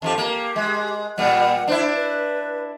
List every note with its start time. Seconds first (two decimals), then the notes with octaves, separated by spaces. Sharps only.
0.02 F2 F3 G4 A5
0.18 A#3 G4
0.56 G#3
1.18 A#2 G3 F#5
1.68 D4 E4 C5
1.95 B4